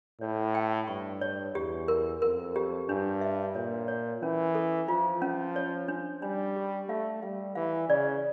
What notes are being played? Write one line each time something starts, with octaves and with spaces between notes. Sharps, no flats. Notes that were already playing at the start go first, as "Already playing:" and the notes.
A2 C#5
G5
G2 C#6
C#5
E2 G4
A#4
F2 A#4
G4
G2 D4
E5
A#2 C#5
C#5
E3 C#4
A4
F3 F4
C#4
C#5
D4
G3 D4
G4
A3 F5
G3 F5
E3 F5
C#3 D5